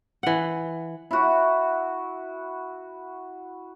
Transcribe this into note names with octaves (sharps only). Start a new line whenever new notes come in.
E3 F#5
E4 F#4